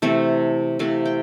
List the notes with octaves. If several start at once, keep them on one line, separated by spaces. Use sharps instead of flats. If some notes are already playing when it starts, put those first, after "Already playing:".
C3 E3 A3 C4 A4
C3 E3 A3 C4 F5
G5